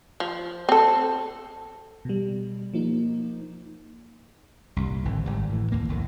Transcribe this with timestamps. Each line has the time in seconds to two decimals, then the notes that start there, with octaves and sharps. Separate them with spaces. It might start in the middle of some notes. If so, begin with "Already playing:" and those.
0.20 F3
0.69 C4 A4
2.05 B2 G3
2.74 F3 A#3 D#4
4.76 C2 G2 A#2
5.05 G#1 D3 E3
5.24 G#1 G#2 G3
5.50 A2 E3
5.72 D#2 E3 A#3
5.89 A#1 D#2 A2 D#3